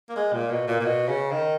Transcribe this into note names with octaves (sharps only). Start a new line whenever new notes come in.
A#3
G#3
A#2
B2
A#2
A#2
B2
C#3
D#3